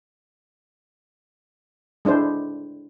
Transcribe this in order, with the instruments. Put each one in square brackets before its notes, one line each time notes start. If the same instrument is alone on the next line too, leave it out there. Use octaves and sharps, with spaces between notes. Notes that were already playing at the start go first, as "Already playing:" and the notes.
[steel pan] G#3 D4 E4 C5